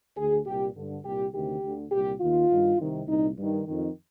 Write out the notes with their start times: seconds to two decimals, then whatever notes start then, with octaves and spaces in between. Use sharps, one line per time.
0.17 D2 D3 G#4
0.46 C2 A#2 G4
0.75 G2 D3
1.04 C2 A#2 G4
1.33 D2 C3 D#3 G4
1.63 D2 D3
1.91 C2 A#2 G4
2.20 D#2 D#3 F4
2.50 G2 D#3
2.79 C2 C3 D#3
3.07 C2 A#2 D#4
3.37 G2 D#3
3.66 F2 D#3